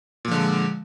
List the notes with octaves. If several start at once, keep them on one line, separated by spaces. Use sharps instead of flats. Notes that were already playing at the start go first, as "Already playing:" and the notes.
A#2 D3 F3 G#3